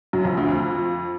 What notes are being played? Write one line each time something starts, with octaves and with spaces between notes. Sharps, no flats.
F#2 F#3
F2 F3
D2 D3
F2 F3